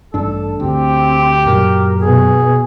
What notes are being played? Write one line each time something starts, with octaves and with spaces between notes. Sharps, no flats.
A1 G2 D4 A4
D2 C4 G4
F#2 A#2 F#3 A#4
B2 G#4